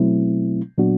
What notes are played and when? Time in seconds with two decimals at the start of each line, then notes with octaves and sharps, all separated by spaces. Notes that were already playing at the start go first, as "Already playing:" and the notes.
Already playing: B2 F#3 A3 C4 E4
0.78 A#2 F#3 B3 D4 F#4